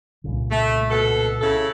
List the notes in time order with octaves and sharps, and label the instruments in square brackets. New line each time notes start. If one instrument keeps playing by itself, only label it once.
[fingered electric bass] C2 A#2 C#3
[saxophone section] A3
B2 A4
C#3 E4 A4